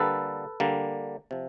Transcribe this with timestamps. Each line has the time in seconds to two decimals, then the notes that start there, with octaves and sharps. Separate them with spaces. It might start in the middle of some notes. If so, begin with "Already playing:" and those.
Already playing: D3 G3 A#3 A4 B4
0.60 D3 G3 A#3
1.31 C3 F3